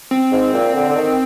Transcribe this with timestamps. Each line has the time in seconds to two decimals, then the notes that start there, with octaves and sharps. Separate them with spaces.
0.11 C4
0.32 G#2
0.54 A#2
0.74 D3
0.88 D3
0.96 D#3